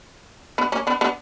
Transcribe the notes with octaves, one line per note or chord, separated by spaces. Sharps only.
B3 D4
A#3 C#4
B3 D4
B3 D4